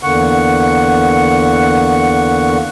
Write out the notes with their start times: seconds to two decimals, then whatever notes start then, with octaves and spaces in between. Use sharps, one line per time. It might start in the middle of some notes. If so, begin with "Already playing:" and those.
0.03 E2 D3 A#3 F#5 C#6